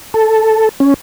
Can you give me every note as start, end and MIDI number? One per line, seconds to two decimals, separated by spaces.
0.14 0.69 69
0.80 0.94 61